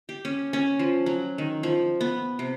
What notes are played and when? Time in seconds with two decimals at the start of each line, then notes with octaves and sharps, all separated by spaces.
0.09 G4
0.25 C#4
0.53 C#4
0.79 F3
1.06 F#3
1.38 D#3
1.63 F3
2.01 B3
2.39 C3